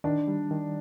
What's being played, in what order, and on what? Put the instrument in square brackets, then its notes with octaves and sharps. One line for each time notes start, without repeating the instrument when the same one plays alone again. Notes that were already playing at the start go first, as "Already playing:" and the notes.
[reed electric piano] D#3 [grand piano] D4
[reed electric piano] G3
D#3